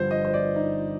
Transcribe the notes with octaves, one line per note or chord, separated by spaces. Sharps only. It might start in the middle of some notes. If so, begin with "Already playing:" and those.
Already playing: G1 G2 F3 C5
D#5
C5
D5
D#4